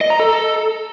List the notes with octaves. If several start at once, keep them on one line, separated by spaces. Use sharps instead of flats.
D#5
A#5
A4